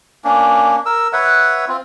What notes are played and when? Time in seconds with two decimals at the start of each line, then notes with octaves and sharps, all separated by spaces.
0.24 A#3 C#4 D4
0.86 A#4 E6
1.13 B4 C#5 E5 F#5
1.68 C4 F4